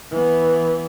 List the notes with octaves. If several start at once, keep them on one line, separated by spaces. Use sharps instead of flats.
E3 B3